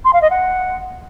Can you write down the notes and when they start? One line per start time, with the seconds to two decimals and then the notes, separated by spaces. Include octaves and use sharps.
0.05 C6
0.13 F5
0.22 D#5
0.30 F#5